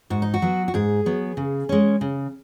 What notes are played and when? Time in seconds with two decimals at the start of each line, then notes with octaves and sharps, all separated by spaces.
0.10 G#2 F#4
0.22 D#4
0.34 F#4
0.42 F#3 B3
0.68 F#4
0.74 G#2 G#4
1.06 F#3 B3
1.37 C#3
1.69 G#3 C#4
2.01 C#3